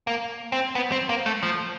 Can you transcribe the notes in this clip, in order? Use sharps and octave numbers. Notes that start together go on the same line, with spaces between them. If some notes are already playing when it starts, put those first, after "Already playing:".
A#3
C4
B3
C4
A#3
A3
F3